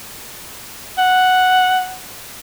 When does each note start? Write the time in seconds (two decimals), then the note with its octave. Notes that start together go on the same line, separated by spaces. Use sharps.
0.98 F#5